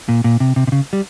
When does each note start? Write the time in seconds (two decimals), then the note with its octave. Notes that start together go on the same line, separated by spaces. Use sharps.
0.09 A#2
0.24 A#2
0.40 C3
0.56 C3
0.67 C3
0.72 C#3
0.93 G3